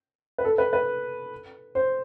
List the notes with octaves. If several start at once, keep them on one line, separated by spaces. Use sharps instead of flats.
B4
A4
B4
B4
C5